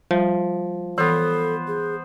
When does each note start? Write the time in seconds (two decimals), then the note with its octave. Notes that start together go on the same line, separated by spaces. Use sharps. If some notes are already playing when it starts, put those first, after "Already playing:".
0.11 F3 G3
0.98 E3 B3 A4 C5
1.67 G#4